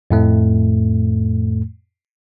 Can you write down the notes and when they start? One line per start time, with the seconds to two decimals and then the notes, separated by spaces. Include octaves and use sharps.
0.10 F2 A2 A3